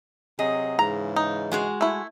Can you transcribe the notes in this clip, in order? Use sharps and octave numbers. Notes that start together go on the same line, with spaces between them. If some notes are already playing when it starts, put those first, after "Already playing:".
C3 F#3 G#4 D#5
G#2 C#3 E3 A#5
D#4
G#3 F#4 G#4
A3 E4